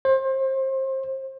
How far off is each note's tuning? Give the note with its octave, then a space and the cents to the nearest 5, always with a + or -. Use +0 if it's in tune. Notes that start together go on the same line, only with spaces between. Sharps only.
C5 +30